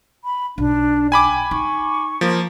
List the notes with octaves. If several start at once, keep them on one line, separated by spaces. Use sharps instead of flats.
B5
B1 D4
G5 G#5 B5 D6
D#4 C#6
F3 A#3